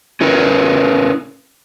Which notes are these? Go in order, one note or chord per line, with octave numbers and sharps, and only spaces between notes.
C#4 E4 A#4 B4